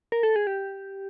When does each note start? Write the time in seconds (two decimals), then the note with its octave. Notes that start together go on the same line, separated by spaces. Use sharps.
0.12 A#4
0.23 A4
0.36 G#4
0.47 G4